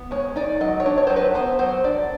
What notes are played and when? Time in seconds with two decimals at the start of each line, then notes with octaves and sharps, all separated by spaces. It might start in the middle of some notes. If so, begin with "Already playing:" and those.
Already playing: B3
0.11 G#3 C#5
0.36 D#4 D5
0.61 F#3 D#5
0.80 C#5
0.86 D4
0.98 C#5
1.07 F#3 C5
1.16 B4
1.34 B3 C5
1.59 F#3 C5
1.84 D4 D5